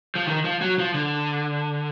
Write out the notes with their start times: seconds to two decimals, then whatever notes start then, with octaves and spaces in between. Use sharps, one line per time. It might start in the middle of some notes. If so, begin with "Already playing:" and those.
0.15 F3
0.27 D#3
0.44 F3
0.61 F#3
0.78 F3
0.94 D3